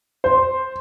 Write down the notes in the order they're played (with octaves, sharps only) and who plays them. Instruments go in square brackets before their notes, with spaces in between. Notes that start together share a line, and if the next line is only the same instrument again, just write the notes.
[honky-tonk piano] C5